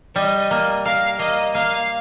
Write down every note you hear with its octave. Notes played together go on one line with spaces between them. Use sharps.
G3 D#5
A#3
A#4 F5
A#3 D#5
A#3 F5